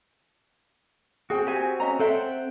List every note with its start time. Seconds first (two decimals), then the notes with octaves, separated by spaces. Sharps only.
1.30 C4 F#4 G#4 G5
1.47 G4 G#5
1.80 C#4 D#5 A#5
1.99 C4 A4 C5 E5 F#5 G5